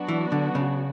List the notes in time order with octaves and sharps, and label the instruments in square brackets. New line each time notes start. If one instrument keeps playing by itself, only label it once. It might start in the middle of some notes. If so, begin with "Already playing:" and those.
Already playing: [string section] F#3 B3 D4 F#4
[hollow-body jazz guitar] E3
D3
C#3